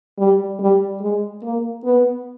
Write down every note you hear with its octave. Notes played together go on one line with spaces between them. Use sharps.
G3
G3
G#3
A#3
B3